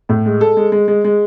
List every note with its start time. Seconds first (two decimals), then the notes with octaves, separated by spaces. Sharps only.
0.09 A2
0.26 G#3
0.41 A4
0.57 G#3
0.72 G#3
0.88 G#3
1.04 G#3